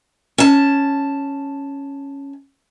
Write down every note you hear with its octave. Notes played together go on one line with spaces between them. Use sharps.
C#4 A5